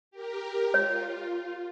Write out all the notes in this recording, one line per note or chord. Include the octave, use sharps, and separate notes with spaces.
G4 A#4
F4 C#5